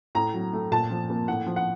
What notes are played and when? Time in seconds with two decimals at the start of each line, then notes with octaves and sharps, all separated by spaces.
0.15 A2 A#5
0.34 F#3
0.53 A3
0.72 A#2 A5
0.90 F3
1.10 A#3
1.28 A2 F#5
1.46 F3
1.56 F#5